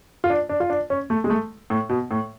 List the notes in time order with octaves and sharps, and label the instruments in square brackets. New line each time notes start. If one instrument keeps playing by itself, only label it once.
[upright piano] F4
D4
D4
F4
D4
C#4
A3
G#3
A3
A2
B2
A2